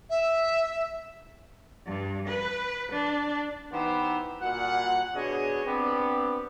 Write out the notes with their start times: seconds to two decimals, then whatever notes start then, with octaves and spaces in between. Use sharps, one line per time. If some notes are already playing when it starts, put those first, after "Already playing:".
0.10 E5
1.86 G2
2.27 B4
2.92 D4
3.72 E3 B3 D#4 G4 C5
4.41 A#2 G3 F#4 F#5
5.15 B2 D4 G#4 C#5 D#5
5.65 B3 C4 D4 G4